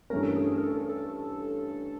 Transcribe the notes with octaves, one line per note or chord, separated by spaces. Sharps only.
G2 E3 A3 C#4 A#4
A4
G#4
A#4
A4
A4